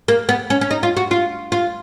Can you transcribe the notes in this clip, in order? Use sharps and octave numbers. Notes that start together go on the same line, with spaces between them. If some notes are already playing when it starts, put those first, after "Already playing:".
A#3
B3
C#4
C#4
D#4
F4
F#4
F4
F4